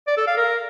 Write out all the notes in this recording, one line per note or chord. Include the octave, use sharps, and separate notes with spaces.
D5
A4
F5
A#4